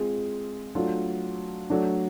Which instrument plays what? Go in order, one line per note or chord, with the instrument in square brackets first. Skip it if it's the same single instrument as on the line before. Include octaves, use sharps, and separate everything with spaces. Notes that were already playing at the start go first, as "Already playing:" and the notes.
Already playing: [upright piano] G#3 C4 F4 G#4
F#3 A3 D4 F4
F#3 A3 D4